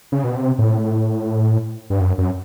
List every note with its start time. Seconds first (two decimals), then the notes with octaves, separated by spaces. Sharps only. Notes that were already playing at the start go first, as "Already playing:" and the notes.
0.12 C#3
0.24 B2
0.36 C3
0.59 A2
1.90 G2
2.00 F#2
2.18 F#2